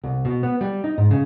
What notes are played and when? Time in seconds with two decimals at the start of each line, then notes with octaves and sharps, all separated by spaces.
0.04 C2
0.25 B2
0.43 B3
0.61 G3
0.84 D#4
0.98 G#2
1.11 C#3